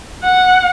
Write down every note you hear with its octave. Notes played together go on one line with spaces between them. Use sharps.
F#5